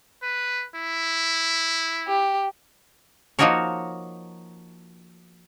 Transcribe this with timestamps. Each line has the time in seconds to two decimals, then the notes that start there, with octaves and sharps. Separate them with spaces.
0.22 B4
0.75 E4
2.08 G4
3.39 F3 A#3 D#4 F#4 A#4 C#5